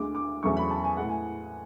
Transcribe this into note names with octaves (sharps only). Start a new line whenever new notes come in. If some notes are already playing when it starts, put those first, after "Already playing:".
Already playing: D2 D3 G#3 D6
D6
E2 C#3 F#3 A3 C#6
B5
A5
G#5
A2 G#3 F#5
G#5